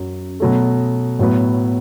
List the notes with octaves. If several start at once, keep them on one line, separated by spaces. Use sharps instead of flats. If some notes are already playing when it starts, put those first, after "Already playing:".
Already playing: F#2 F#3
B2 F#3 A3
A2 F#3 B3